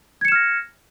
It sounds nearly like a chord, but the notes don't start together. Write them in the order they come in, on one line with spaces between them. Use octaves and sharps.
G#6 C#7 E7 F6 A#6